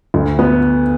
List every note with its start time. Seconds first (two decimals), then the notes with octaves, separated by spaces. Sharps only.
0.14 D2
0.39 B3